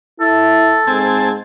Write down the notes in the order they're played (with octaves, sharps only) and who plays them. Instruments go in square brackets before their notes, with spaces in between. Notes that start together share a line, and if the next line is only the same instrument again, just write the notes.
[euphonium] E4 [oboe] A4
[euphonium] G#2 [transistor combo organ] C4 G#5 A5